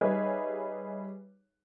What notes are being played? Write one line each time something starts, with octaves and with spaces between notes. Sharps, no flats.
G3 D#4 G#4 B4 C#5 E5